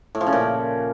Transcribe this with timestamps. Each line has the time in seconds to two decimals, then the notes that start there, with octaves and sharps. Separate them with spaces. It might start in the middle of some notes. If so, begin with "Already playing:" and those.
0.15 A2
0.21 F3
0.27 C#3
0.33 A#2